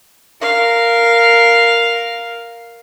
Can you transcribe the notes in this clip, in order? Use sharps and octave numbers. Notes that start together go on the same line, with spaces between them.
A#4 F5